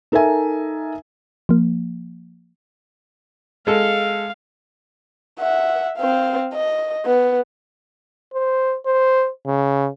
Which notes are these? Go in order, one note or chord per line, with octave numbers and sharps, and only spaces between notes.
D#4 A4 A#4 E5 G#5
F3 A#3
G#3 A4 F5
E5 F#5
C4 F5
D#5
B3
C5
C5
C#3